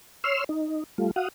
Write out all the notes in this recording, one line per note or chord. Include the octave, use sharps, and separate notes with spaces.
C#5 C6 E6 F6
D#4
G3 A3 F4
F#4 F5 F#5 D#6